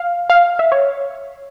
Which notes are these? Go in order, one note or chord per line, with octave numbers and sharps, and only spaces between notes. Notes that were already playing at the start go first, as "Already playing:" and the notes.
Already playing: F5
F5
E5
C#5